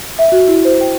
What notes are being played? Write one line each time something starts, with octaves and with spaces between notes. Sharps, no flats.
E5
F#4
E4
C5
G5